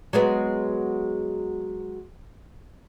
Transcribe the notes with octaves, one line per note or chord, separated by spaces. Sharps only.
F#3 G#3 B3